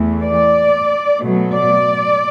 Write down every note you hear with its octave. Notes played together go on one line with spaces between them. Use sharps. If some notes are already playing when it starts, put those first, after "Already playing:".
Already playing: E2 E3 A3
D5
B2 F#3 A3
D5